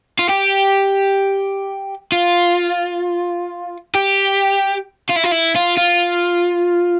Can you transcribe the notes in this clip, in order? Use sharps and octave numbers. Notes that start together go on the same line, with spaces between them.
F4
G4
F4
G4
F4
E4
F4
E4
F4
F4